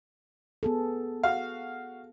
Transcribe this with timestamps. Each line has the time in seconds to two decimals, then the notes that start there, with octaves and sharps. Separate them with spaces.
0.63 B3 G#4 A4
1.23 F#4 F5